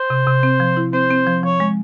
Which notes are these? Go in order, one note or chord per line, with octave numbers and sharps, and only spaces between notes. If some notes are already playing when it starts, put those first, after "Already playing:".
Already playing: C5
C3
C3
C4
F3
E4
C4 C5
C4
F3
F3 C#5
G#3